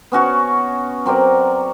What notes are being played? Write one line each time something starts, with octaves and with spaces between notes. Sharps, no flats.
B3 C#4 F#4 C#5
F#3 C4 A#4 D5